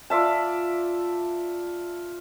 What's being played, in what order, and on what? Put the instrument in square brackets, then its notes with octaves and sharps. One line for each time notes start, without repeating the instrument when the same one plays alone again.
[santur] F4 D5 E5 A5